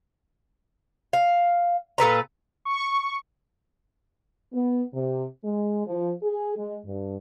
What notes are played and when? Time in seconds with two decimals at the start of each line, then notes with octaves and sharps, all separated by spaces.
1.13 F5
1.98 A#2 A4 B4 A#5
2.65 C#6
4.53 B3
4.94 C3
5.44 G#3
5.87 F3
6.23 G#4
6.57 G#3
6.85 G2